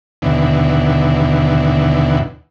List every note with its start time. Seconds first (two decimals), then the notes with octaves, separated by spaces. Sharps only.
0.22 D#2 B2 D3 E3